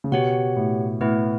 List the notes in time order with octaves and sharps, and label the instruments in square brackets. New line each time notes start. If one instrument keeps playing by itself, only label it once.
[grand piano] C#3
[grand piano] B2 [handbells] G4 C#5 F#5
[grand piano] A2
[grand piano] A2 [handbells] B3 E4 B4